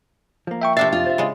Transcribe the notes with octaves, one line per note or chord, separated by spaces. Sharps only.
F3 A#3
E5 G5 C#6
C3 D4 E5 F5 A6
F2 F4
C5 E5
C#3 G#3